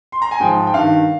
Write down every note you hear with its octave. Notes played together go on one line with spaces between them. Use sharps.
C6
A#5
G#5
G#2 F3 G5
G5
G2 D#3 F5